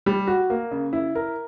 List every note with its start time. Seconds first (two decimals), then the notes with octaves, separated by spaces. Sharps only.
0.06 G3
0.27 F#4
0.50 A#3
0.71 C#3
0.93 E4
1.15 A#4